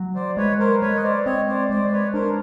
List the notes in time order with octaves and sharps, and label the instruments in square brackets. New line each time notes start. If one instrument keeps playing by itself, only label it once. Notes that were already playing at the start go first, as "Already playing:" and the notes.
Already playing: [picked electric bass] F#3
[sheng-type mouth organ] C5 D5
[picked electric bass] G#3 [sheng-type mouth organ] B4 C#5
[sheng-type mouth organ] A#4 C5
[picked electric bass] G#3 [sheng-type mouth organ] B4 C#5
[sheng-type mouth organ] D#5
C5 D5
[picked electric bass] C4 [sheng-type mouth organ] C#5 D#5
[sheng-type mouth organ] C5 D5
[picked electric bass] G#3 [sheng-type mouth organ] C5 D5
[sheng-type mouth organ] D5
B4 C#5
[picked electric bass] D4 [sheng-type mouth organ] A#4 C5